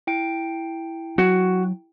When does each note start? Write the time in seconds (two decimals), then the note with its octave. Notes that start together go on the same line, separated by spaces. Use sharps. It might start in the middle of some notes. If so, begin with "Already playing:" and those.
0.07 E4 G5 D7
1.18 F#3 F#4